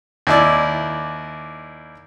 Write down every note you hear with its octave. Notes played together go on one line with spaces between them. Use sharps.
D#2 E4 D5